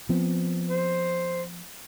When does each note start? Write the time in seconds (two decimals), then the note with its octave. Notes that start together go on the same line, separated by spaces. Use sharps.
0.09 F3 B3 C4
0.70 C5